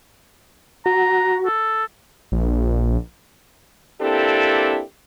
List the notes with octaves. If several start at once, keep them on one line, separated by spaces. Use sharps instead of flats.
F#4 A#5
A4
A#1
A#3 C4 D4 E4 G4 A4